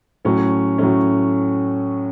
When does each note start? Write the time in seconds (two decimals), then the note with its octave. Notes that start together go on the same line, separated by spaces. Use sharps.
0.25 A2 F#3 A3 C#4
0.78 A2 F#3 A3 C#4